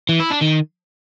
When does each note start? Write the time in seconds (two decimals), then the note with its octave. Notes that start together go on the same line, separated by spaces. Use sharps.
0.09 E3
0.20 E4
0.30 D4
0.41 D#3